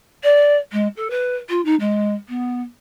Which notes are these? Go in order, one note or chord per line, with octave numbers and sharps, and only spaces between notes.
D5
G#3
A4
B4
F4
D#4
G#3
B3